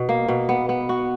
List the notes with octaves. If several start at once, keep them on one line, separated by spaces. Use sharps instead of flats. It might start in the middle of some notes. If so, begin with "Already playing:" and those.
Already playing: B2
A#3
B2
B3
B3
F#4